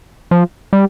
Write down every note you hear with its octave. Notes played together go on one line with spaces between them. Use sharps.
F3
G3